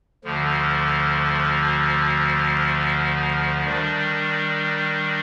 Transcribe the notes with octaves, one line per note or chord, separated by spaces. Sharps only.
D2 D3 F3
D#3 G3 D4